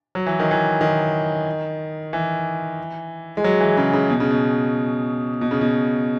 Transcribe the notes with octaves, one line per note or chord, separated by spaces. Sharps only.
F#3
E3
D#3
E3
D#3
E3
G#3
F#3
E3
C#3
C#3
B2
C#3
B2
B2
C#3
B2